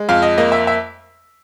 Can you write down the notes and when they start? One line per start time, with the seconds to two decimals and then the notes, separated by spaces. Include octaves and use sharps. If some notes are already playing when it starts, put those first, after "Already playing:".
Already playing: G#3
0.09 F2 F5
0.22 D#5
0.38 A#3 D#5
0.52 E5
0.67 E5